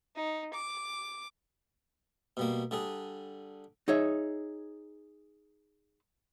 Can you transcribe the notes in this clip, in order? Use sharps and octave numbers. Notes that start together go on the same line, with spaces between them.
D#4
D6
B2 G3 A#3
D3 G3 D4 G#4
D#4 G#4 C#5 E5